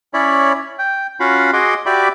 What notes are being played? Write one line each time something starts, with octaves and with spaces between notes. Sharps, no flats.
C#4 E4 C#5 D5 B5
G5
C#4 F4 F#4 F5 F#5 B5
F#4 G#4 D#5 F#5 C6 D6
F#4 G4 D5 E5 B5 D6